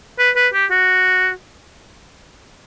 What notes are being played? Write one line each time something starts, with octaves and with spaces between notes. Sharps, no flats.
B4
B4
G4
F#4